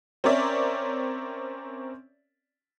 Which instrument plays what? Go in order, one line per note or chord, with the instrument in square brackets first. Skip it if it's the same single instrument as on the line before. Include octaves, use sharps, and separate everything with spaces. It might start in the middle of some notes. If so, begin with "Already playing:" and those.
[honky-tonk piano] C4 C#4 A#4 C#5 D5 E5